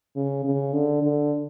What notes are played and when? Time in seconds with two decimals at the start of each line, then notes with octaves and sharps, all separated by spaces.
0.16 C#3
0.45 C#3
0.73 D3
1.02 D3